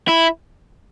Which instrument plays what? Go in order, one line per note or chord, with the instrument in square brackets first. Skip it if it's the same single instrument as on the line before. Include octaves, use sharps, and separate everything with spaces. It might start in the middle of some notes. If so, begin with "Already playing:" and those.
[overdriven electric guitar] E4